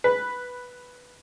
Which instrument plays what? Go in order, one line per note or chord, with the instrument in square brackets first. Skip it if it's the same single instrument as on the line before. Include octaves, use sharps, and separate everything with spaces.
[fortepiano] B4